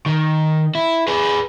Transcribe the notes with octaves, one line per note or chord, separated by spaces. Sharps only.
D#3
E4
G#4 B4